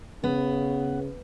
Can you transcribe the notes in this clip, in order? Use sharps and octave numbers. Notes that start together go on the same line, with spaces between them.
C#3 B3